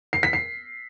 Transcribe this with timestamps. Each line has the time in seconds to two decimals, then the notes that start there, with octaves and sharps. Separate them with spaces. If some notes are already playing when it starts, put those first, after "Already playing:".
0.13 C7
0.23 B6
0.33 C7